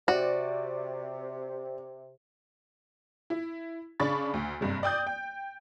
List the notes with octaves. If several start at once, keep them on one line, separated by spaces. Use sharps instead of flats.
C3 F#4 D5
E4
C#3 D4 B5 C#6 A6
D2
F#1 G2 C3
D5 G5 D#6 G6
G5